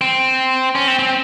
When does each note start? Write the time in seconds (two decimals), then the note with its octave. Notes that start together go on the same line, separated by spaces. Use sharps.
0.01 C4
0.75 C#4
0.88 C4
0.99 C4